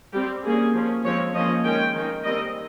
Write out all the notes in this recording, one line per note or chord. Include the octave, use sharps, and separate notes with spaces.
G3 C4 G4
G3 A#3 C#4 G#4
F3 A#3 C#4
F3 G#3 C4 C#5
F3 A#3 C#4 D#5
D#3 G#3 C#4 G5
D#3 A#3 C#4
D#3 G3 C4 D#5